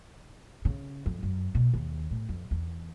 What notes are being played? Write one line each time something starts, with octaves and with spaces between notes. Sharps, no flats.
C#3
F2
F#2
B2
D#2
A2
F2
E2